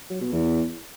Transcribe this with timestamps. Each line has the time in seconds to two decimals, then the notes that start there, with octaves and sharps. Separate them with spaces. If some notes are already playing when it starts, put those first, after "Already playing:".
0.10 F#3
0.21 B2
0.33 E2